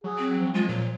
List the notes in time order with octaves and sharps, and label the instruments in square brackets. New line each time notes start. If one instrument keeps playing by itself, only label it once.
[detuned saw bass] F#3 [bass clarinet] G#4
[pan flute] C4
[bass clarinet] F3
[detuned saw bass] G#3 [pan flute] F4
[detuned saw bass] A#2 [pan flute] F#3